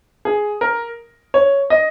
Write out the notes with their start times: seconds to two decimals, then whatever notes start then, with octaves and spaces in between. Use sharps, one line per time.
0.25 G#4
0.61 A#4
1.34 C#5
1.70 D#5